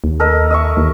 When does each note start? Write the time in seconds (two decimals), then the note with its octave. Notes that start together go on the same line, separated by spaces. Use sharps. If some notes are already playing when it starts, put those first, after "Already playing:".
0.04 D#2
0.20 A4 A#4 D#5
0.51 D#5 E5 C#6
0.77 D#2